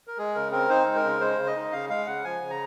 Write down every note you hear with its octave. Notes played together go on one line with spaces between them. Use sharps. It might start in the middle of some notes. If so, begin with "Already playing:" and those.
A#4
G#3 G#4
C#3 A#4
C4 A#4
D#4 C5
G#3
A#4
C#3
G#3 C5
C#3
D#5
D#4
C#3 F5
G#3 F5
C#3 F#5
F3 G#5
C#3
A#5